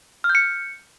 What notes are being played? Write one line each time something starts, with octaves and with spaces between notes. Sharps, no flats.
F6
G6
C#7